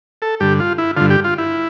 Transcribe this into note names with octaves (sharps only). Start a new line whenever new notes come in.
A4
G2 D3 G4
F4
E4
G2 D3 F4
G4
F4
E4